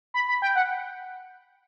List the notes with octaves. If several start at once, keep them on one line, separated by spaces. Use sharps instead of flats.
B5
B5
G5
F#5